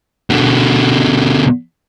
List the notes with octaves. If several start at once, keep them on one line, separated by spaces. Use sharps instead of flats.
B2 D3